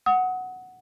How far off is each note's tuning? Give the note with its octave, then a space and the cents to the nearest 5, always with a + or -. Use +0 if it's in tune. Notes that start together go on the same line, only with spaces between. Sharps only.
F#5 +0 D#6 +30